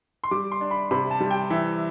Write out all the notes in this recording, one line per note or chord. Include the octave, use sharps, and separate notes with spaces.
C6
G3 D6
C6
D4
B5
C3 B5
A5
G3
G5
E3 E5